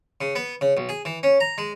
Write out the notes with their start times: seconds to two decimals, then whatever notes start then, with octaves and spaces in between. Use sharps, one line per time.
0.21 C#3
0.35 B3
0.61 C#3
0.77 B1
0.89 G#4
1.05 E3
1.23 C#4
1.40 A#5
1.58 G#3